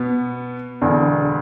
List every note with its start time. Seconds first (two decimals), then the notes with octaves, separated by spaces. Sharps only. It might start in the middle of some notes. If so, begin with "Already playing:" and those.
Already playing: B2 B3
0.82 E1 E2 D3